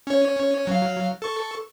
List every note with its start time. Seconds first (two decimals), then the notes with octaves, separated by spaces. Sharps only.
0.07 C#4 C#5
0.67 F#3 F5
1.22 A4 C#6